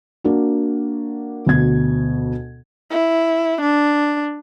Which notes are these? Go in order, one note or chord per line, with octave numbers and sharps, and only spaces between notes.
A#3 D4 F#4
D2 B2 G#6
E4
D4